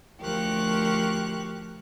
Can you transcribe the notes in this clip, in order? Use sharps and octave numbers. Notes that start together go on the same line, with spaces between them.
D2 F3 G4 A#4 C#6 F#6